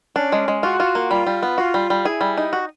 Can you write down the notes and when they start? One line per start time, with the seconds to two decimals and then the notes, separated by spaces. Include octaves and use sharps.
0.16 C#4 D4
0.32 G#3
0.48 G#3
0.63 F4 F#4
0.80 F4
0.95 A#3
1.11 G3 F4
1.27 G3
1.43 B3
1.58 F4 F#4
1.74 G3
1.90 G3
2.05 E4 G#4
2.21 G3
2.38 D#4
2.53 F#4